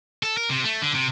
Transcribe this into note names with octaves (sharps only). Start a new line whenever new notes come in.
A4
A#4
C3
A3
D3
C3